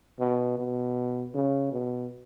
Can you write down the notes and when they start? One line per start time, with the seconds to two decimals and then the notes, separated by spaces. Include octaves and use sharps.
0.19 B2
0.58 B2
1.34 C#3
1.72 B2